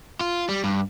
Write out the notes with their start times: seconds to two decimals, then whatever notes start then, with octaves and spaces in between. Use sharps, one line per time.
0.21 F4
0.49 G3
0.64 G2